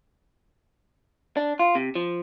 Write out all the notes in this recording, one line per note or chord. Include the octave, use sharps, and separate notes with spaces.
D4
F4
C3
F3